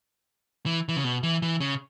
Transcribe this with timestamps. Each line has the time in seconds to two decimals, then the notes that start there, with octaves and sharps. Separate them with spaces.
0.66 E3
0.89 E3
0.97 C#3
1.04 B2
1.23 E3
1.42 E3
1.60 C#3